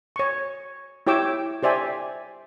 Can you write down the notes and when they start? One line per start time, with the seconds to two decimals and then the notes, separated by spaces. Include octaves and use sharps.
0.16 C#5 C#6
1.07 E4 G4 C#5 G5 D6 E6
1.63 G4 C5 D5 E5 G#5